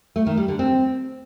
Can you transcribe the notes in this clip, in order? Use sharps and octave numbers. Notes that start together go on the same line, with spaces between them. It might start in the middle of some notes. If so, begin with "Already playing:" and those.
A3
D#3
G3
D3
C4